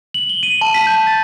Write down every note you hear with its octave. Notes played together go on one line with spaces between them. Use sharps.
F#7
G7
D#7
A5
B6
G6
A6